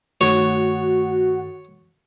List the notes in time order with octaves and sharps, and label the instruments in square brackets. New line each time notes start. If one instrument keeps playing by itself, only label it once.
[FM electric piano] G2 D#3 A3 [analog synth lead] F#4 [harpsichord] C#5